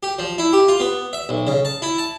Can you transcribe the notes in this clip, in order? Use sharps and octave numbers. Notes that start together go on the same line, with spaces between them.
G4
F3
E4
G4
F4
B3
E5
B1
C#3
A5
E4
A5